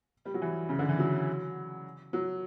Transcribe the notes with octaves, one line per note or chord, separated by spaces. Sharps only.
G3
F#3
E3
C#3
D3
E3
F#3
F#3